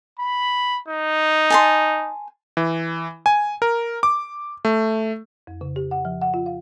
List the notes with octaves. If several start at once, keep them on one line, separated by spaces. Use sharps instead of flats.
B5
D#4
G#5 A5 C6
E3
G#5
A#4
D6
A3
F2
C#3
G4
F#5
F3
F#5
F4
F5